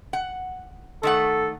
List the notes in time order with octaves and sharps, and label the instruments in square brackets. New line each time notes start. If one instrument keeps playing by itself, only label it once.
[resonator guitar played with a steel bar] F#5
[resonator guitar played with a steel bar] D#3 A3 F#5 [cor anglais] A4